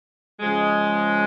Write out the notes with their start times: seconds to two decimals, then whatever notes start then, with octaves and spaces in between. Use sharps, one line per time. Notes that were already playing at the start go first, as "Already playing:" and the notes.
0.40 C#3 F3 G#3